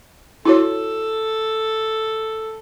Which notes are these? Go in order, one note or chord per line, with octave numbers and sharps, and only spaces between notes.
E4 F#4 A4 C#5